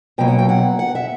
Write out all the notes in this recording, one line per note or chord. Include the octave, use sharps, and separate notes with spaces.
B2 F#3 A#3 G5
F#5
G5
F#5
F#5
E5